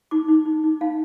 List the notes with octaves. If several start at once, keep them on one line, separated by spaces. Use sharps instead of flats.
D#4 D6
D#4
D#4
D#4
D#4 F5